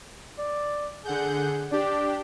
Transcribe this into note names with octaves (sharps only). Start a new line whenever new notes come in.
D5
D3 G#4 F#5 G6
D4 G4 D5